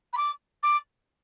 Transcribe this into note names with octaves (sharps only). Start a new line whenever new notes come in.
B5
D6
D6